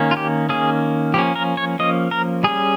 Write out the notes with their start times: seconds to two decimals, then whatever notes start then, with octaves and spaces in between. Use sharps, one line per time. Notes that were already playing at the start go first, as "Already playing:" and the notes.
Already playing: D#3 A#3 C#4
0.11 F4
0.17 G4
0.49 D#3 A#3 C#4 G#4
1.14 F3 A#3 C#4 G4
1.36 A#4
1.57 C#5
1.79 F3 A#3 C#4 D#5
2.11 A#4
2.43 G3 C#4 G#4